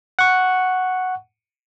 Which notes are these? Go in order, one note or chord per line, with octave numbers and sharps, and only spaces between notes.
F#5 C#6